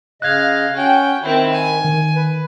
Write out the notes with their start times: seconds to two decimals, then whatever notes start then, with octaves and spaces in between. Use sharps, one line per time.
0.22 C#3 D#5 F5 F#6 G#6
0.75 C#4 F#4 G5
1.23 D#3 C4 E4
1.53 G#5
1.85 D#3
2.15 B4